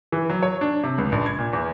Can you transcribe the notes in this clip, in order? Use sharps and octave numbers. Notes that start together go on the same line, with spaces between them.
E3
F#3
C#5
D4
C3
C#2
A#1
G#6
A#2
E2